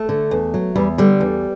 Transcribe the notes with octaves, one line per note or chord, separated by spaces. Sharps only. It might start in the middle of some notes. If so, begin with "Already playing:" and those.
Already playing: A3
D3
E2
F#3
E2 G3
D3 G3
E2